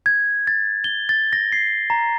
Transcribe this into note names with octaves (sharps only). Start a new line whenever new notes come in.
G#6
A6
G7
A6
A#6
C7
A#5